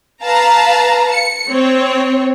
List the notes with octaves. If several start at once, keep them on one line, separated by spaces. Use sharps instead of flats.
B4 F5 A5 A#5
C#7
C4 C#5